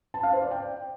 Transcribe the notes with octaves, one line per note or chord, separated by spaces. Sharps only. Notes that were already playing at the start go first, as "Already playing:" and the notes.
A5
F5
C5
D5
G5